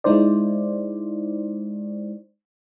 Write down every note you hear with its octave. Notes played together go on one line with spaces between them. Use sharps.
G#3 D#4 E4 C5 D5